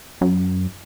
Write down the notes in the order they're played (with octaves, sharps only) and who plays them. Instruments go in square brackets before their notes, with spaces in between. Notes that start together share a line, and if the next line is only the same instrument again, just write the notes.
[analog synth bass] F#2